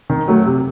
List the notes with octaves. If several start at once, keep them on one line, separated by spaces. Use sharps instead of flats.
D#3
F#3 A3
C3